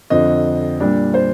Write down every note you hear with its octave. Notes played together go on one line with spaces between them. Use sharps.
F2 D3 F3 C4 D#5
A#2 G3 D4
C5